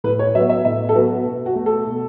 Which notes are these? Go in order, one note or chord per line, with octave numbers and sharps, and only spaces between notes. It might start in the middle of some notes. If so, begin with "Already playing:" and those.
A2 B4
C#5
F#3 B3 E5
E5
A2 E5
A4
F#3 B3 F#4
B2
F#4
A3
A4
B2